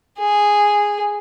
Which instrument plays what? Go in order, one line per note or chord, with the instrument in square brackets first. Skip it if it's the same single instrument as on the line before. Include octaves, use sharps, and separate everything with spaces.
[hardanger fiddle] G#4